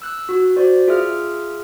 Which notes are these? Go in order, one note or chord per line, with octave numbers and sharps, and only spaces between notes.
E6 F#6
F#4
F#4 C5 D5
F4 G#4 E5 F6